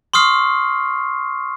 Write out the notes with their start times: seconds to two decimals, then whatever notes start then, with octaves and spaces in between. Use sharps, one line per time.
0.14 C6 C#6 D#6 F6 C7